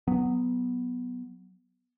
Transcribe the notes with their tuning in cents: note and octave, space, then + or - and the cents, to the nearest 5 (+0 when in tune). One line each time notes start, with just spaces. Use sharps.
F#3 +0 B3 +0